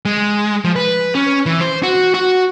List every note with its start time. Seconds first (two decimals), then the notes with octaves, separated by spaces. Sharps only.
0.05 G#3
0.64 F3
0.76 B4
1.15 C#4
1.46 E3
1.61 C5
1.83 F#4
2.14 F#4